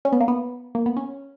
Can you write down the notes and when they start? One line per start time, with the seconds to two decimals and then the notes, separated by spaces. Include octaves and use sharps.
0.05 C#4
0.12 B3
0.21 A#3
0.28 B3
0.75 A#3
0.86 B3
0.97 C#4